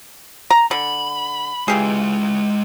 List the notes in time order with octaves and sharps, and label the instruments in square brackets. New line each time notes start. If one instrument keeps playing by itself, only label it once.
[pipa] A#5
[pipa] D3 [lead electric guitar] B5
[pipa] E3 G4 G#4 [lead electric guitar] G#3 F4